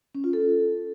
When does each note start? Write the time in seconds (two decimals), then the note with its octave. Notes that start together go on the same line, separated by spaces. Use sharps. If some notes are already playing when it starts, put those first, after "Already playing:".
0.15 C#4
0.24 F4
0.33 A4